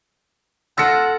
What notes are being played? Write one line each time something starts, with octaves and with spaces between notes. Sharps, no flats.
F4 A4 F#5 E6 A#6 C#7